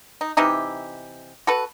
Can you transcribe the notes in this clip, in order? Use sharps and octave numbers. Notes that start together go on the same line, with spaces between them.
D#4
C3 E3 D#4 G4
F#4 A4 B4